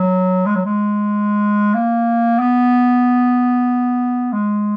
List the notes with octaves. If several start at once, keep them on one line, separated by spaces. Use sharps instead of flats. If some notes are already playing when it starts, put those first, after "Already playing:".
Already playing: F#3
G#3
F#3
G#3
A#3
B3
G#3